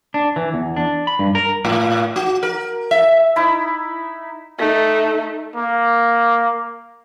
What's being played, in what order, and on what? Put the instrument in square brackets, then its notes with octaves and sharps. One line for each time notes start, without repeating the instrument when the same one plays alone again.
[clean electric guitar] D4
E3
E2
D4
B5
G2
A#4
[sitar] A2
F#4
A#4
E5
[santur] D#4 E4 B5
[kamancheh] A3 D#4
[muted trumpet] A#3